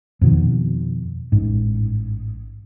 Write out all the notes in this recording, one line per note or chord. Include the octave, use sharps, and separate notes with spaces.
F2 B2 D#3
A1 G#2